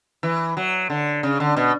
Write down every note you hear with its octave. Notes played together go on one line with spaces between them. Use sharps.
E3
F#3
D3
C#3
D3
B2